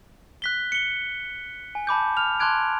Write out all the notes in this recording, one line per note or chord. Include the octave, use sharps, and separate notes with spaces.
F#6 B6 G7
C#7 G7
G#5
A5 B5 D6 G6
F6 F7
A5 C6 D6 F#6 G#6 D7